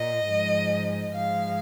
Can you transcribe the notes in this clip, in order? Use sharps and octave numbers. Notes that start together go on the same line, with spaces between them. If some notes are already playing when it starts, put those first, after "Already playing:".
Already playing: A#2 D#5
G#2 F3 G#3
G#2 F3 G#3 F5